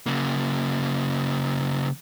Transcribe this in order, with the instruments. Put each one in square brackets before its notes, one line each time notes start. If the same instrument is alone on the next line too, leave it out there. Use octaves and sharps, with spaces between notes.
[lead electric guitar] C#3 A#3